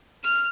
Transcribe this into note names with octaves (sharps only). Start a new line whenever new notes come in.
F6